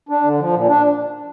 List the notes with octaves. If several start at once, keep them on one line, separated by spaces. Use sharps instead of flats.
D4
D3
F3
A#2
D4